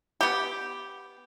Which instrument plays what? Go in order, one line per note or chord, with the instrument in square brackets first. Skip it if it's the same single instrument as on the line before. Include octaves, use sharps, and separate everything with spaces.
[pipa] B3 G4